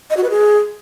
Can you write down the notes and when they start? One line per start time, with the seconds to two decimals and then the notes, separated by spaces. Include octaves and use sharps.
0.10 D#5
0.17 F#4
0.23 B4
0.30 G#4